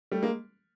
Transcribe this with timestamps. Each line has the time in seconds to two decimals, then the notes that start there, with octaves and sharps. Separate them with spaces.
0.12 G3 A3
0.23 G#3 A#3